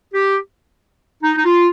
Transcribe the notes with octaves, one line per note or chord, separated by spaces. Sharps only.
G4
D#4
D#4
F4